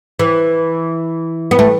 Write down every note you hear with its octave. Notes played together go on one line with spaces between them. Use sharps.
E3
B3
A3